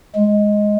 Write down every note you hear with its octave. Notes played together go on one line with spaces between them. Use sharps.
G#3